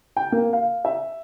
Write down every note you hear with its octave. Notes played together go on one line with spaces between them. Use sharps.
G5
A#3
F5
E5